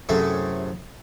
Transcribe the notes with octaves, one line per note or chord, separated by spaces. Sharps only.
F#2 A2 C3 A3 G#4